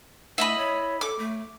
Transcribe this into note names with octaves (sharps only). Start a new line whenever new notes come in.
A3 E4 D#5 B5
C#5
A4 D6
A3